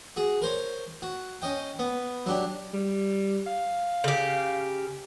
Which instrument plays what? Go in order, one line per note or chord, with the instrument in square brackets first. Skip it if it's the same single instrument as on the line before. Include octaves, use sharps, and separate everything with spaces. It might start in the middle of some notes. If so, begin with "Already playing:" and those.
[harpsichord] F#4 G#4
A#4 C5 C#5
F#4
C#4 D#5 G5
B3
F#3 D4 G4
[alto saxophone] G3
F5
[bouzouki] C#3 G4